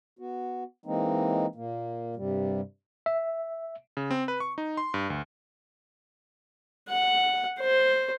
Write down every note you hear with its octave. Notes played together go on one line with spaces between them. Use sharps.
B3 F#4
E3 G#3 A#3 C4 D#4
A#2 A#3
G2 C3 G3
E5
C#3
C4
B4
C#6
D#4
C6
G2
D2
F#5
C5